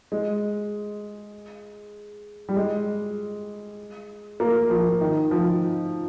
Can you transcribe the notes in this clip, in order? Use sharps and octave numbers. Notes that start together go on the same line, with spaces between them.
G#3
G3
G#3
A#3
F3
D#3
F3